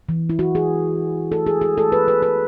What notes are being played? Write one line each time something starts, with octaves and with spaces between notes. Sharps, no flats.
E3
E4
F#4
G#4
A4
G#4
G#4
A4
B4
B4
B4